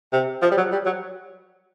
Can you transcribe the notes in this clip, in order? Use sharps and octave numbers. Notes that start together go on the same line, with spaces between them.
C3
F3
G3
F#3
G3
F#3